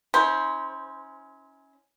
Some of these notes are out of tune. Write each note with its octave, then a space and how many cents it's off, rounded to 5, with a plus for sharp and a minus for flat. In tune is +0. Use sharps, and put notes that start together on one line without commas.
C#4 +0 E4 -40 C5 +0